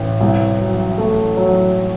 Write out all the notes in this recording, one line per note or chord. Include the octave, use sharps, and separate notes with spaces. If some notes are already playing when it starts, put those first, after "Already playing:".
Already playing: A1
C2
F#3
A3
F#3